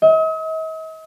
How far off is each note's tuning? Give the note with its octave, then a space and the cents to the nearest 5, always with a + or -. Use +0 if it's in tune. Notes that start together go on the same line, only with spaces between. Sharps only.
D#5 +45